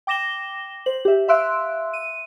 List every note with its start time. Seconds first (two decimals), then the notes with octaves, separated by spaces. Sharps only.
0.07 G5 D6 A#6 E7 G7
0.86 C5 F#7
1.05 G4 E5
1.28 E5 F5 C6 E6 F#6 D7
1.93 D#7